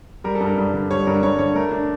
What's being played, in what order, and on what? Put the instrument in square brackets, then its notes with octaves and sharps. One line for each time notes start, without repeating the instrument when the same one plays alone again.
[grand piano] G3 [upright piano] A#4
[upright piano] A4
[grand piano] G2
[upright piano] A#4
[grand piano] G2
D3
[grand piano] G3 [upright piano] C#5
[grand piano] G2 [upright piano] A#4
[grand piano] G2 [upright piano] C#5
[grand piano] D3 [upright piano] C#5
[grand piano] A3 [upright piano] A#4
[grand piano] D4